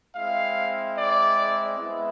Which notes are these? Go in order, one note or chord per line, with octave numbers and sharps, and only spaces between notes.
G#3 C4 E4 F5
D5
G#3 B3 E4